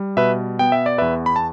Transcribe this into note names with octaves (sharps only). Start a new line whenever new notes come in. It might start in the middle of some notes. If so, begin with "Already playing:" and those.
Already playing: G3
B2 B4 E5
B3 G5
E5
D5
E2 B4 E5
B5
A5